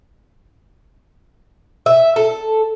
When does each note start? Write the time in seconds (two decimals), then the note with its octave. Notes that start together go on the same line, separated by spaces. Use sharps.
1.86 E5
2.16 A4